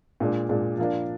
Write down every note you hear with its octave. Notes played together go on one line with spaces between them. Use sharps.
A#2 G#3 D4
A#2 G#3 D4
F3 A#3 D4